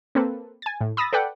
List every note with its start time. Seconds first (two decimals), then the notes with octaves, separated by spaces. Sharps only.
0.15 A#3 C4 A4 B4
0.62 G#5 A6
0.81 A2
0.97 B5 D#6 E6 A6 A#6
1.13 A4 B4 D5 F#5 G5